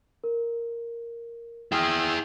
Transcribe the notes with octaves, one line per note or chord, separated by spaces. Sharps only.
A#4
E4 G#4 G5 D#6 F6